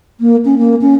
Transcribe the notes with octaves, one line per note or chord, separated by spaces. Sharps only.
A#3
C#4
A#3
C#4